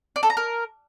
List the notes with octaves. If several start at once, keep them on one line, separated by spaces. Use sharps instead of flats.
D5
A4
A#5
A#4